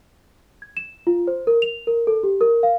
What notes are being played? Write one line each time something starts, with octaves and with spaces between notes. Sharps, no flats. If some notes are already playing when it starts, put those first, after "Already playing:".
G#6
E7
F4
C5
A#4
F7
A#4
A4
G4
A#4
F5